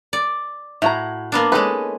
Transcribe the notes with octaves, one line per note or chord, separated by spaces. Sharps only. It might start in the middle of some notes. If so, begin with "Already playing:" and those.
D5
A2 E4 F#4 A#5
A#3 B3 D4
G#3 C#4 D#4 A4 B4